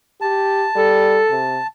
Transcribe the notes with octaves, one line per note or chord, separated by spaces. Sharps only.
G4 A5
G3 A4
C3